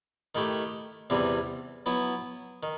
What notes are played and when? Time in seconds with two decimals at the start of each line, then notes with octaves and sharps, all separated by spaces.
0.35 D#3 A3 E4 G4
1.10 E2 C3 E3 G3
1.86 F#3 B3 E4
2.63 D#3